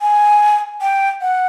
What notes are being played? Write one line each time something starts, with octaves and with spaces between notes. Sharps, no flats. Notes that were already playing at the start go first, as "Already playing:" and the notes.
G#5
G5
F#5